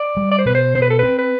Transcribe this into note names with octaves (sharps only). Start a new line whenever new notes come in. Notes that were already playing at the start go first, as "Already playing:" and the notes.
Already playing: D5
G3
D5
C5
B2 B4
C5
B2 C5
B4
A4
C4 B4
B4